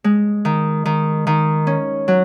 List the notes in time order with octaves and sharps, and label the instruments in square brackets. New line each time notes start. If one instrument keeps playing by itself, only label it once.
[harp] G#3
D#3
D#3
D#3
C#4
F#3